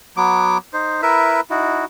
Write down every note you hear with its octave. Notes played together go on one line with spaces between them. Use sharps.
F#3 B3 D6
D#4 C5
E4 A#4 B4 E5
D#4 E4 F#4